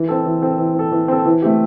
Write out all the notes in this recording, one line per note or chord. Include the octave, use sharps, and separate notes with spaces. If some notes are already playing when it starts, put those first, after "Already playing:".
Already playing: E3
C4 A4
E3
C4 A4
E3
C4 A4
E3
C4 A4
E3
A3 C4 G4